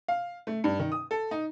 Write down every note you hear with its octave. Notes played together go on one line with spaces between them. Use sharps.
F5
A3
G2
D#3
D#6
A4
D#4